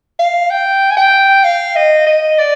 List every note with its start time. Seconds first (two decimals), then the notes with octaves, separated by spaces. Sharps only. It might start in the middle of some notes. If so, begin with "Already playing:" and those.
0.19 F5
0.50 G5
0.91 G#5
0.97 G5
1.44 F5
1.76 D#5
2.06 D#5
2.38 D5